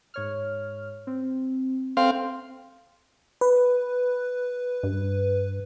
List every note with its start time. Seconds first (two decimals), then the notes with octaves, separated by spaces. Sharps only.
0.14 G#2 C#5 F6
1.07 C4
1.97 C4 A4 F5
3.41 B4
4.83 G2